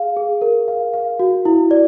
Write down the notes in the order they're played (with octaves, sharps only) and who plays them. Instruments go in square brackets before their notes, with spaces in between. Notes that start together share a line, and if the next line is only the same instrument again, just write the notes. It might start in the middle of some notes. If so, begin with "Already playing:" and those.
Already playing: [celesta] G#4 F5
G#4
A#4
F5
F5
F#4
E4
D5